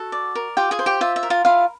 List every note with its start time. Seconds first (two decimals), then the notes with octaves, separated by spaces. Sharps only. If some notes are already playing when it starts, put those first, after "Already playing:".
Already playing: F#4 A4 F#5
0.12 D5
0.35 A#4
0.57 F4 G4 G5
0.71 G#4 G#5
0.79 C5
0.86 G4 G5
1.01 F4 E5
1.16 E5
1.23 A#4
1.30 F4 F5
1.45 E4 F4 F5